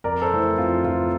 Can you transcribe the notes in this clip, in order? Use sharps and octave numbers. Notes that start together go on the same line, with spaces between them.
F2 A#4 D5
A4 C5
E3 A3 C4
E4
F2 F4
E3 A3 C4 F4